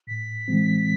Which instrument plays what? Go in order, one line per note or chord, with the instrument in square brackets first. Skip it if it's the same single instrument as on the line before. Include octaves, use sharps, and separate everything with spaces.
[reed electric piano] A2 [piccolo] B6
[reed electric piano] E3 G#3 C4